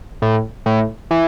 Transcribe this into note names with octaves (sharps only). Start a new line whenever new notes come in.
A2
A2
E3